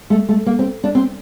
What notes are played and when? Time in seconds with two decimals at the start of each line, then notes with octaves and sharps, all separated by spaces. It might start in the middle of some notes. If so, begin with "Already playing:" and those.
0.10 A3
0.29 A3
0.46 A#3
0.59 C4
0.84 D4
0.95 C4